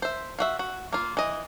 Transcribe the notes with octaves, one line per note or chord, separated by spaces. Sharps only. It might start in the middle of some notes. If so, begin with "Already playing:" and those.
C5 E5
F4 F#4 E5
F#4
A#3 F4
E3 D#5